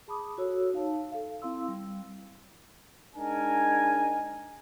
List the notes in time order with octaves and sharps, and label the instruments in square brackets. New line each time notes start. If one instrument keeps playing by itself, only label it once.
[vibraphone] G#4 A5 B5 D6 D#6
F#4 A4 C#5 E6
D#4 F5 A5
A4 F5
C4 E4 F5 C6 E6
G3
[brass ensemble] G#3 D4 D#4 A#4 G#5